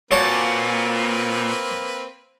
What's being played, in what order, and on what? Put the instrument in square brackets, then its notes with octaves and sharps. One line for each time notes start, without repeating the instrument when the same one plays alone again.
[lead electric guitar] A#2 [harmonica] A#3 C4 B4 [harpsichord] F#4 C#5 A5